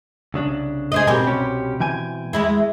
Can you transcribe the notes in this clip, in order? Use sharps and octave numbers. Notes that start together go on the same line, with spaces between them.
C2 C#3 D4
G#4 C5 D#5
G#2 B2 G3 C4 A#4 G#5
C2 C#4 G4
E3 G5 G#5
E2 G#3 E4